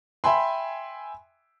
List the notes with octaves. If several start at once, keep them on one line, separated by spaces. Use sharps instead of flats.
E5 G5 G#5 B5 C6